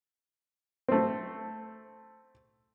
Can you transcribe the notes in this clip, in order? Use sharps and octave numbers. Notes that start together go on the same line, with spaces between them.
A3 C4